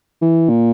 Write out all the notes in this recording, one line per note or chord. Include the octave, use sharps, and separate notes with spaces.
E3
A#2